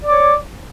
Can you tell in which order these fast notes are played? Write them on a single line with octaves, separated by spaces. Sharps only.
D5 D6 C#5